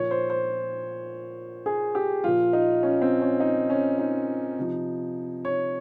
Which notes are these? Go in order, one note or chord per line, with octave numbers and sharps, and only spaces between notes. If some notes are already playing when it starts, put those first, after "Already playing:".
Already playing: A#2 F3 C#5
C5
C5
G#4
G4
A#2 F3 F4
D#4
C#4
C4
C#4
D#4
C#4
D#4
C3 F3
C#5